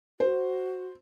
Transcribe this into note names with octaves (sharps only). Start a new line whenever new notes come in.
F#4 C5